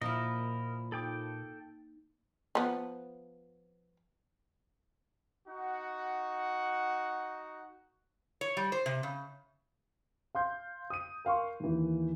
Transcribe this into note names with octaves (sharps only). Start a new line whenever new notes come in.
A#2 F3 A#3 E4 A#4 D#5
D#4 A4 G5 D6
F3 B3
D#4 F#4 F#5
C#5
G3
C5
C3
C#3
F5 C6 G6
D#6 D#7
A#4 F5 C6 C#6
D#2 E3